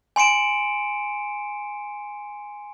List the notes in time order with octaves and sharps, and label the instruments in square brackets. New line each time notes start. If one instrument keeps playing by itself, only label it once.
[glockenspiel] G#5 C6 C#7 D7 E7